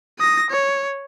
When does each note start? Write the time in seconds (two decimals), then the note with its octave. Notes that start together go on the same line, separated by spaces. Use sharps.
0.19 D#6 A#6
0.50 C#5